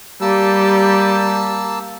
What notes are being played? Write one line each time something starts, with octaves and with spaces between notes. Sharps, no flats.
G3 A#3 A5 E6